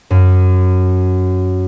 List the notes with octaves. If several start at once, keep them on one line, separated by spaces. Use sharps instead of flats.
F#2